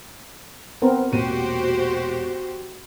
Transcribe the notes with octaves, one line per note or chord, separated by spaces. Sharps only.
B3 C4 A#4
E1 A#2 F#4 G4 C5 D#7